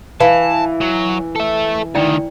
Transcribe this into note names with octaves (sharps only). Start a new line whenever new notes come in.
E3 F5 A5
F#3
A4 E5
D2 D#3 E4 D5 G5